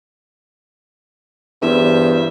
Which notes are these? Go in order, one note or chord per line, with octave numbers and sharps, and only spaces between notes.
E2 G2 C5 E5